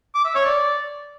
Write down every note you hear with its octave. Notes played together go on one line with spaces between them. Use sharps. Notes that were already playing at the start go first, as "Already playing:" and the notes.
D6
E5
C#5
D5